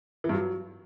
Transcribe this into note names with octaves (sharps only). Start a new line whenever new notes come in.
E3
G2
F#3